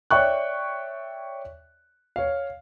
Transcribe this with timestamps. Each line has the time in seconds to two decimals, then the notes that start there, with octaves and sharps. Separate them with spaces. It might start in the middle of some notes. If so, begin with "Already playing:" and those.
0.10 C#5 D5 E5 G5 C#6 F#6
2.16 C#5 F5